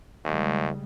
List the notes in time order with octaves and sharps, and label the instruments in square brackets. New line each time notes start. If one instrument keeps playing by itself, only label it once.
[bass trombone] D#2 [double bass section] C#3 G3 G#3